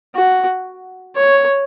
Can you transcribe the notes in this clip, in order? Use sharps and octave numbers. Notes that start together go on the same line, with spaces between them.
F#4
C#5